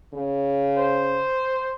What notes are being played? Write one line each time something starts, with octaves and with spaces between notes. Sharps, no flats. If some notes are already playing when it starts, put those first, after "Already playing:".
C#3
C5